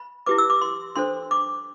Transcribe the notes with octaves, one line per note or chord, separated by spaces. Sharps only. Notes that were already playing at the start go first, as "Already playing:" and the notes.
Already playing: B5
E4 G4 B4 D6
E6
D6
C6
D4 A4 C5 C6
D6